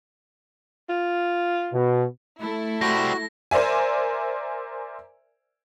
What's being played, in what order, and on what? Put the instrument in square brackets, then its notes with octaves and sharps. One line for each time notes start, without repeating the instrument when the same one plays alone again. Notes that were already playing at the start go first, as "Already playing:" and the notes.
[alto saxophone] F4
[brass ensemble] B2
[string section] A3 E4 A4
[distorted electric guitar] G3 C4 [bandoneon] F#4 [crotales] A#6
[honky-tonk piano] A#4 C5 D5 E5 G#5